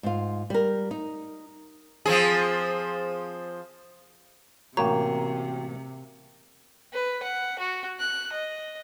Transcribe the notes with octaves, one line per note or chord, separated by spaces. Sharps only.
G#2 F4
G3 A#4
D#4
F3 C4 G#4
A1 C3 A#3 F#4 A#4 C#5 G5 A#5
B4
F#5
F#4
F#6
D#5